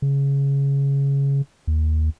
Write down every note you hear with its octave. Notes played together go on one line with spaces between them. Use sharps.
C#3
D#2